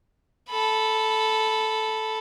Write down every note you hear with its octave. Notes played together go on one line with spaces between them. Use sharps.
A4 B5